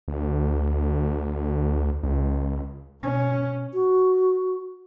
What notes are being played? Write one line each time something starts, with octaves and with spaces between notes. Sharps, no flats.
D2
C#2
B2 C#4
F#4